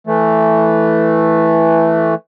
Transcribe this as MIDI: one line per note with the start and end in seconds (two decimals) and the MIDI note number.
0.07 2.14 52
0.07 2.14 57